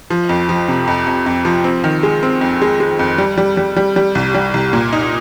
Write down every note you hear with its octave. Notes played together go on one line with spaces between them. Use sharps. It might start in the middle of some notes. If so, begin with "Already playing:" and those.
F3
F2
F3
C3
F2
F2
F2
F3
C4
D#3
G#3
C4
F2
G#3
G#3
F2
G3
G3
G3
G3
G3
C2
G3
C2
A#2
D#4